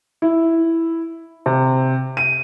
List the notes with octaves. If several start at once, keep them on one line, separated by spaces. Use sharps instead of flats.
E4
C3
D#7